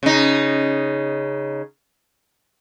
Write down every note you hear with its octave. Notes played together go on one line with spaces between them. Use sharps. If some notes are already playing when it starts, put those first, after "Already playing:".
C#3 D#4